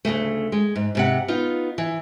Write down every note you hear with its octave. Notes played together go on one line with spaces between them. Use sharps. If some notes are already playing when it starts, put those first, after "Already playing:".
D2 A#2 C#3 A3
G#3
G#2
G#2 C3 F#5
B3 D#4 F4
E3